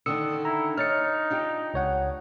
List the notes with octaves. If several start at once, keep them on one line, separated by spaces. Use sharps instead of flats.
D3 D#3 D4 D#6 E6 C#7
E4 A#5
D#4 C#5 F6 A6 C#7
D4 F4 G4
C#2 C#5 F#5